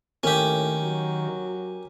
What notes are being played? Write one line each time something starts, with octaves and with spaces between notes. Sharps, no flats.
A2 D#3 A#3 C#4 G4
F#3